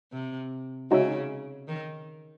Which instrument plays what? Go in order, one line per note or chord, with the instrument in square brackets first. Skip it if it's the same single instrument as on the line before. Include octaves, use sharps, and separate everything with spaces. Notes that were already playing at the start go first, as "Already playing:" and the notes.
[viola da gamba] C3
[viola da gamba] C#3 [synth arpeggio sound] G#3 D#4 F#4 C#5 E5
[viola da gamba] D#3